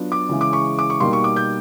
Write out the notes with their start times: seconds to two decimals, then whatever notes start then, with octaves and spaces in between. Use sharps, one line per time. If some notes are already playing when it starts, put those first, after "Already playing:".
Already playing: F#3 B3 D4 F4
0.12 D6
0.29 C#3 E3 G#3
0.41 D6
0.53 C#6
0.79 D6
0.90 C#6
1.00 B2 G3 A#3 D#4 C6
1.13 C#6
1.24 D6
1.36 G6